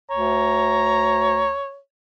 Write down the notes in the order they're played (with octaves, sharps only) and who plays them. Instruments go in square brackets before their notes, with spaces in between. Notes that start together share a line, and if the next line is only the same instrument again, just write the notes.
[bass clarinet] D2 [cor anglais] C#5 [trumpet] A#5